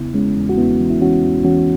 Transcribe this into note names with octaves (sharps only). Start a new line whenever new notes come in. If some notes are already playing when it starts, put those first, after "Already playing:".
Already playing: E2 C#3 B3 E4
E2 G#3 C#4
E2
F#4
E2 B3 E4
E3
E4
E3 C#4 F#4
E2
E3 C#4 F#4